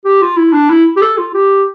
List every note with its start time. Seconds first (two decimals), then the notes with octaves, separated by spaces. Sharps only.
0.05 G4
0.22 F4
0.37 E4
0.53 D4
0.70 E4
0.97 G4
1.02 A4
1.18 F4
1.34 G4